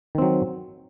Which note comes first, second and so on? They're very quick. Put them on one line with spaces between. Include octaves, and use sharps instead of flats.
D#3 C4 F#3